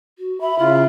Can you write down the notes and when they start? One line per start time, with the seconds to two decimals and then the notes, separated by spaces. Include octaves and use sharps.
0.19 F#4
0.41 E5 B5
0.59 C#3 E4 F4